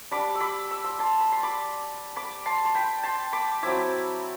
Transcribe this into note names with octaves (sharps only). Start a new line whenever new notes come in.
G3 D4 B5 D6
E6
B5 D6
E6
C6 E6
A5 C6
B5
C6
B5 D6
B5 D6
A5 C6
C6
G5 B5
A5 C6
B5 D6
F#3 C4 E4 B5 D6